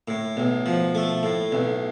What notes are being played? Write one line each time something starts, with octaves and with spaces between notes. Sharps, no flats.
A2
B1
F3
A3
A2
B1